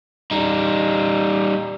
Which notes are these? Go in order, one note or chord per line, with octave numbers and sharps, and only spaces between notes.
G3 D#4